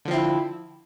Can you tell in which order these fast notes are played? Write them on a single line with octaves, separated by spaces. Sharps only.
D3 F3 C4 E4